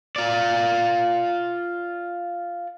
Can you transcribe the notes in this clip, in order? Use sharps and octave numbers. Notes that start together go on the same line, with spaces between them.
F4 D5